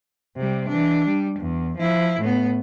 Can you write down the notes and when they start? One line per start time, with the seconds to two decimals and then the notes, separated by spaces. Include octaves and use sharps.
0.36 C3 G3
0.68 E3 D4
1.07 G3
1.39 E2
1.77 F3 E4
2.20 A2 B3